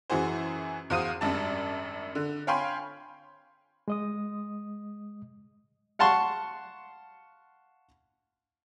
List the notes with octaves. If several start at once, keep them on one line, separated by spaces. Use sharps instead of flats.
F#2 E3 F#4 G#4 C5
E2 F#4 C5 F5 D#6 D#7
G#1 F#2 G3 D4 A5
D3
C#5 F5 G5 G#5 B5 C6
G#3 D#5 D#6
F5 F#5 A5 C6 C#6